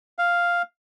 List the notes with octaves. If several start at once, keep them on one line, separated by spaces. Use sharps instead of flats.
F5